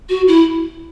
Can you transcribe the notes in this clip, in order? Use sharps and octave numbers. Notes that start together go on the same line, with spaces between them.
F#4
E4